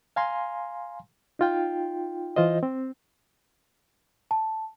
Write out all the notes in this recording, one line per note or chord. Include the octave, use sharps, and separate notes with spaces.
F5 G#5 A#5 C6
D#4 F4 G5
E3 F4 C5 D#5
C4
A5